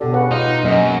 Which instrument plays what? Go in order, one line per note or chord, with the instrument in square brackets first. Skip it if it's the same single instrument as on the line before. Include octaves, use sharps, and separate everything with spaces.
[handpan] B2 G4 [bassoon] D3
[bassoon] C#3 [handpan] B4 F#5
[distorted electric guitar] D#4 [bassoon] F4
[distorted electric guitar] F#2 [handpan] F#3 A#3 D#5 [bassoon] G#3